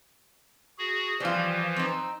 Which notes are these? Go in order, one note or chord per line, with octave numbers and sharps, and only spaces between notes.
F#4 G#4
E3 F3 G3 F4
C4 D#4